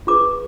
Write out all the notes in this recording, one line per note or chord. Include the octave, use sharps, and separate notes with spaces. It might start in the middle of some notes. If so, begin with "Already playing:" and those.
F4 G#4 B4 D6